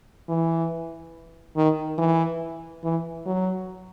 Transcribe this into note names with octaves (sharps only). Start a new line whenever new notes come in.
E3
D#3
E3
E3
F#3